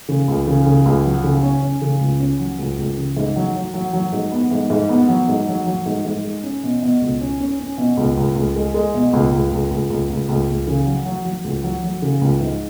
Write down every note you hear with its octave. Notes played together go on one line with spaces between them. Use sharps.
C#3
C#2
C#3
C#3
C#2
F#3
C#3
C#4
C#4
C#3
C#2
C#4
F#3
C#2
C#2
C#3
G#2
F#3
F#3
F#3
F#3
G#2
B3
G#2
G#2
B3
F#3
G#2
F#3
F#3
G#2
G#2
G#3
C#4
B2
B2
C#2
C#4
C#4
C#4
B2
C#2
C#2
C#2
G#3
G#3
B2
C#2
C#2
C#2
C#2
C#2
C#2
C#2
C#2
C#3
F#3
F#3
F#3
C#2
F#3
F#3
C#3
C#2
G#2